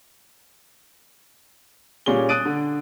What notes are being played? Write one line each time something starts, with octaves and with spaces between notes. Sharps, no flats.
A#2 G3 C#4 G#4 G7
D#6 F#6 A6 D7 D#7
D3